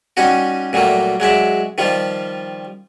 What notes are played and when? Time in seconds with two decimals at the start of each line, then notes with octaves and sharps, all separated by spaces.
0.17 G3 C#4 D#4 F#4
0.73 A#2 F#3 G3 A3 A#3
1.20 F#3 G#3 D5 E5
1.78 D#3 F3 G3 F4